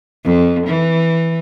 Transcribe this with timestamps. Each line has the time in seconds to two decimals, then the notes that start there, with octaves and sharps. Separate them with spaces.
0.25 F2
0.67 E3